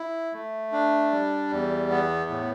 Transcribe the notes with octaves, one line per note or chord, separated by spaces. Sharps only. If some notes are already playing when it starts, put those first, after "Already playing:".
Already playing: E4
A3
D4
G3
E2
B3
A2